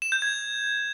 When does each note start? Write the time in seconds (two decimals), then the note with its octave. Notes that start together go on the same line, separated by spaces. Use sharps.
0.02 E7
0.12 G6
0.22 G#6